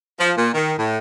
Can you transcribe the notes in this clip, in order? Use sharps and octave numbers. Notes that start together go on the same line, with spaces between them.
F3
A#2
D#3
A2